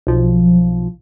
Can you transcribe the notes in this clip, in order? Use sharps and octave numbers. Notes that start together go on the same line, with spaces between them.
B1 F3